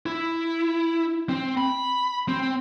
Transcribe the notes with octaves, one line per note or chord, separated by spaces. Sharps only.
E4
C4
B5
C4